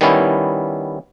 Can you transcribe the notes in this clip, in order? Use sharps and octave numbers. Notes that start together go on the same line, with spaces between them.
D#3 G3 B3 C#4 E4